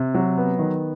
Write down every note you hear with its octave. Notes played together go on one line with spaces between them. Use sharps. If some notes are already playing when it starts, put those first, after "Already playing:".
Already playing: C3
F#3
B3
D#3